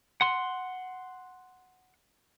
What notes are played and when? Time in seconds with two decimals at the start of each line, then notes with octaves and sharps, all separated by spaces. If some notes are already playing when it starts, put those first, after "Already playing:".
0.21 F#5 C6